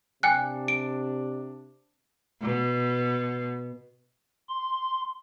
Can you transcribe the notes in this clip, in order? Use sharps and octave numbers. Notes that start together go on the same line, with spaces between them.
C3 D4 G5 G#5 F#6
D7
B2
C6